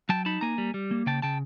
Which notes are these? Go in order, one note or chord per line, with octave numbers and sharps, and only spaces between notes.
F#3 G5 A5
D#4 A5 B5
A#3 G#5 A#5
G3
G3
A#3
C#3 G5 A5
C#3 G5 A5